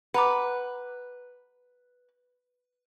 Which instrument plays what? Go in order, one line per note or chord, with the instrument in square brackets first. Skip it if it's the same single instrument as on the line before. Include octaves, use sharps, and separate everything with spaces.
[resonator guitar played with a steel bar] B4 [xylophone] F#5 A#5 D6